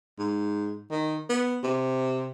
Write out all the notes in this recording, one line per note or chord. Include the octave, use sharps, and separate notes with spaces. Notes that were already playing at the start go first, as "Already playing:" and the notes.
G#2
D#3
B3
C3